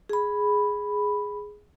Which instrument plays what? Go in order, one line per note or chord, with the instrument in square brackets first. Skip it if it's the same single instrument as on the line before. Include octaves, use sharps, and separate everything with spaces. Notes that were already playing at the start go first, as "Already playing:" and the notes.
[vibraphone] G#4 B5